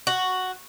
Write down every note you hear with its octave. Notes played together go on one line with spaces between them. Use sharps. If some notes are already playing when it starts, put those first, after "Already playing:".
F#4